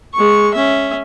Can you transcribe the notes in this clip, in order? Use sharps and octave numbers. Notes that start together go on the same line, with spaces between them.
G#3 C#6
C#4 E5